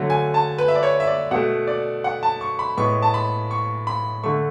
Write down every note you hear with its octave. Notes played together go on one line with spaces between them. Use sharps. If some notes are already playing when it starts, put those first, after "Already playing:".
Already playing: D3 F#3 A3
G#5
A5
B4
E5
D5
C#5
E5
D5
B2 A3 F#5
D5
F#5
A5
C#6
B5
A2 G#3 B3 C#6
A5
B5
C#6
B5
D3 A3 C#6